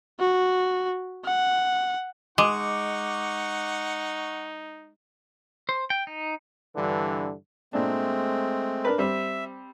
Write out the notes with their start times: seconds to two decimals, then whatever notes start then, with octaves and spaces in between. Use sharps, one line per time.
0.19 F#4
1.25 F#5
2.38 G#3 D#4 F#5 C#6 D6
5.69 C5
5.90 G5
6.07 D#4
6.75 G2 D3 E3
7.73 A#2 G#3 A3 C4 D4
8.85 D4 A#4 B4
8.98 G3 C4 E5